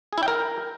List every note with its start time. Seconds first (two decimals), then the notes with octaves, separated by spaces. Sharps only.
0.13 G#4
0.18 E4
0.23 G5
0.28 A#4